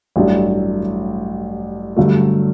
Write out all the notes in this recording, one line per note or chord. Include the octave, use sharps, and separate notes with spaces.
A1 G2 F#3 A3 D4
G2 D3 F#3 A3